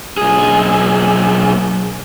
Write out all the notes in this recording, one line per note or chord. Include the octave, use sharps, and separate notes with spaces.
B1 G#4